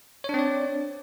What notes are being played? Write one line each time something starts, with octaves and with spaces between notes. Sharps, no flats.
C4 D4 C#5 D5